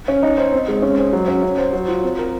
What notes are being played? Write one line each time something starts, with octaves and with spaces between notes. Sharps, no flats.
C#4
D#4
C5
C4
G#3
C#4
C5
F#3
C#4
C#4
C5
F#3
F4
C4
A#4